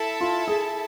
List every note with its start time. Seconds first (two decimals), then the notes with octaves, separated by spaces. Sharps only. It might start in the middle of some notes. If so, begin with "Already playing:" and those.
Already playing: E4 A4 E5 A5
0.21 F4
0.48 G#4